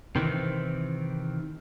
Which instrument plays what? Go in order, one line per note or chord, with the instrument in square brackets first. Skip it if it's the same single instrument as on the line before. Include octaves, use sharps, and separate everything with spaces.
[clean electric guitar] C3 D#3 E3 C4